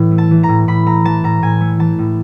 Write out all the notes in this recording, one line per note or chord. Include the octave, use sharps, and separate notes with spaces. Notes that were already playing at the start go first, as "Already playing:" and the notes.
Already playing: A2 E3
A3
A5
E3
A#5
A2
A2 B5
A3 A#5
E3 A5
A2 A#5
A2 G#5
A3
E3 A5
A2